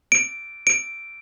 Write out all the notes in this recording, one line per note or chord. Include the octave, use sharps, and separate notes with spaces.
D7
D7